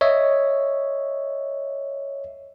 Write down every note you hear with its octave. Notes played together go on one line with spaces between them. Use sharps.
C#5 D#5 E5